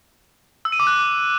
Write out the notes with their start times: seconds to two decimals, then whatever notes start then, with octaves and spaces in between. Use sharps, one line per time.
0.65 E6
0.72 D#7
0.80 D6
0.87 F#6